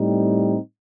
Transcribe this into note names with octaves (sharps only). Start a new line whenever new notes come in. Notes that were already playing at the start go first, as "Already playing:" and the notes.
Already playing: A2 G3 C4 D#4